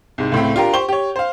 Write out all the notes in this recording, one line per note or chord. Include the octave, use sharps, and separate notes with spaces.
C2 G#2
C#2 A2 A3 C4
D4 F4 G4 A#4
G4 C5 C#6 G7
G4 C#5
C5 F5